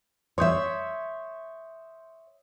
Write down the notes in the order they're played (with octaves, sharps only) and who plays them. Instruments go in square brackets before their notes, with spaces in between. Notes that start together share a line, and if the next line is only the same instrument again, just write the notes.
[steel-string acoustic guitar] C#5 E5 [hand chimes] C6 D#6 G6